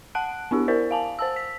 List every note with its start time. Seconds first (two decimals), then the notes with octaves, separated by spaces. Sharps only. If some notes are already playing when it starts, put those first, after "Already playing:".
0.15 F#5 A5 F#6 D7
0.51 B3 D4 E4 G4
0.68 E4 A#4 C5 D5
0.91 F5 G#5 A5
1.19 C5 A5 E6
1.36 B6